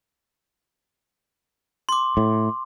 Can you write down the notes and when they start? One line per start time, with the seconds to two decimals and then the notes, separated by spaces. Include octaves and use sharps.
1.89 C6 D6
2.17 A2